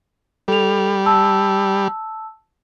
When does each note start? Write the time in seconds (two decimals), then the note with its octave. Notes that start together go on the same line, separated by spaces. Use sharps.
0.48 G3 A4 F7
1.06 A5 E6